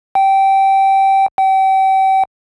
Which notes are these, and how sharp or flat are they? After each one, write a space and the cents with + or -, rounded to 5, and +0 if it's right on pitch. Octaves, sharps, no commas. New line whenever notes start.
G5 -15
G5 -35